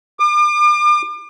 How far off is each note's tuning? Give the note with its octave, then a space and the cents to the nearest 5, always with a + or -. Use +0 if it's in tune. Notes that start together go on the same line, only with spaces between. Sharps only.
D6 +40